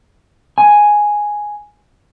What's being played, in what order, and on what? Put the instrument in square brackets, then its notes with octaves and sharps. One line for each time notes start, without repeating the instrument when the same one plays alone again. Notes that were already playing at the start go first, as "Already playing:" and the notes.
[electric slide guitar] G#5